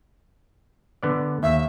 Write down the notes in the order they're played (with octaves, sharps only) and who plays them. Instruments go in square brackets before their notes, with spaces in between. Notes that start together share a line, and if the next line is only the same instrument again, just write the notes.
[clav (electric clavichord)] D3 B3 D5
[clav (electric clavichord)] D#2 [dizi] E5